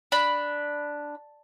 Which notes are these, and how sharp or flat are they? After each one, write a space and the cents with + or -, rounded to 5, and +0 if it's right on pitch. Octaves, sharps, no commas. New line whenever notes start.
D4 +0 B5 +0